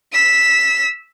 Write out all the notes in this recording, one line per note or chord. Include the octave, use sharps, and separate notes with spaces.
E6 B6